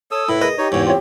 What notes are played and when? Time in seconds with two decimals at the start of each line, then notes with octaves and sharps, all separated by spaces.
0.11 A4 C#5 D#6 E6
0.29 A2 E4 B4 B5
0.41 G#4 A#4 B4 D#5
0.58 D#4 G4 C#5
0.72 E2 G#2 C#5
0.87 C4 F4 C#5